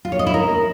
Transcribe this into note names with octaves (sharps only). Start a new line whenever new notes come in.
F4
C#5
D#5
E4
A#4